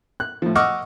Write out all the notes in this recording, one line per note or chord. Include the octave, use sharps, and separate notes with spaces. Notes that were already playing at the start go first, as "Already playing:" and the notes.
F#6
A2 F3
D#5 F#5 C#6 D6 E6 F6